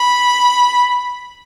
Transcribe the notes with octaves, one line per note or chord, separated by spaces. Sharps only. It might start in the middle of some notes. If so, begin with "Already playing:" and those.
Already playing: B5